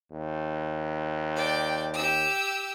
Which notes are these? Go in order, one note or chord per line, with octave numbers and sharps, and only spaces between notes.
D#2
D5 G5
G4 E6